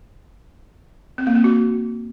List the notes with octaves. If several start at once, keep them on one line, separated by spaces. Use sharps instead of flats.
C4
A#3
C4
F#4